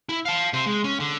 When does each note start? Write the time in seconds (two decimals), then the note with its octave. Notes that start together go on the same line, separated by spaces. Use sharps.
0.09 E4
0.25 F5 A5
0.53 C3 C5
0.66 G#3
0.84 C#4
1.00 D3